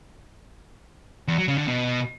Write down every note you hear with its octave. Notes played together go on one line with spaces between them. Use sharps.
E2
F#3
C#3
D3
B2